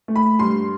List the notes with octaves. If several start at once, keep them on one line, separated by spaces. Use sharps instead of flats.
A3
B5
G2 C6